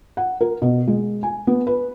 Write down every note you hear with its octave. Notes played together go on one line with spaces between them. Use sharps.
F#5
A#4
B2
G#3
G#5
B3
B4